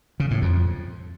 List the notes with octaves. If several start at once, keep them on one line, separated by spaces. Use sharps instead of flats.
C#3
A2
F2